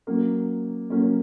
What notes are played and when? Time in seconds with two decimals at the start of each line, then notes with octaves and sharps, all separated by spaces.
0.07 F#3 A#3 C#4
0.90 F#3 A#3 C#4